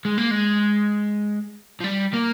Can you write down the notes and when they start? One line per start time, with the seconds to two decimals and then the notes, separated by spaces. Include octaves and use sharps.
0.05 G#3
0.18 A#3
0.31 G#3
1.81 F3
1.84 G3
2.14 A#3